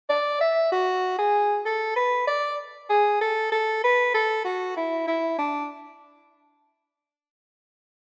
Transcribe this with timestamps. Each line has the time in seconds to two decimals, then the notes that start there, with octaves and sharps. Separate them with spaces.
0.09 D5
0.41 E5
0.72 F#4
1.18 G#4
1.65 A4
1.96 B4
2.27 D5
2.90 G#4
3.21 A4
3.52 A4
3.84 B4
4.14 A4
4.45 F#4
4.77 E4
5.08 E4
5.38 D4